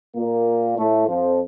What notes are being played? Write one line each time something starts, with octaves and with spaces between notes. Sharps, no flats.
A#2 A#3
A2 A3
F2 F3